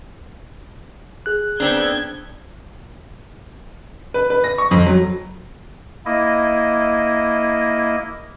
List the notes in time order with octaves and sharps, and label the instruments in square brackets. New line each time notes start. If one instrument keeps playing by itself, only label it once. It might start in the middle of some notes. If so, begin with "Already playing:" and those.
[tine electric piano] G#4 F#6
[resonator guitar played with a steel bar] B3 C4 D4 [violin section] G6 G#6
[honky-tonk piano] B4
B4
A#6
C#6
F2
F#3
[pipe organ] A#3 E4 D#5